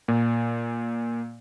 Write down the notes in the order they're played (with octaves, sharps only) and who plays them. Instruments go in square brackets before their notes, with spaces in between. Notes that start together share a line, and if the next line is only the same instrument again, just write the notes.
[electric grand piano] A#2